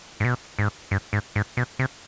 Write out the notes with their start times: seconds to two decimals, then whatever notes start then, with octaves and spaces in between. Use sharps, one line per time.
0.20 G#2
0.25 B2
0.59 G#2
0.91 G2
1.13 G#2
1.36 G#2
1.57 B2
1.79 C3